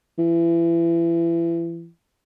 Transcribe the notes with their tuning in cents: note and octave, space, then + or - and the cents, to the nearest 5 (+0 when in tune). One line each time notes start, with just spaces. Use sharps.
E3 +30